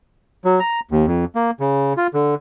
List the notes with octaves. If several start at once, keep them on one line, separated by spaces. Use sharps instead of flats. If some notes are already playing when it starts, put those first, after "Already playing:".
F#3
A#5
D#2
F2
A#3
C#3
F4
D3